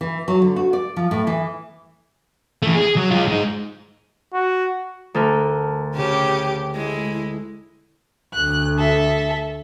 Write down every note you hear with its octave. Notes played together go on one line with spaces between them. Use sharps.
E3
F#3
D3
F#4
D5
F3
A2
E3
E3 A3
G#4
F#3
G#3 F4
G#3 D#4
F#4
D2 A4 A#4
C#3 G4
G#3 E4
D2 F#6
A4 E5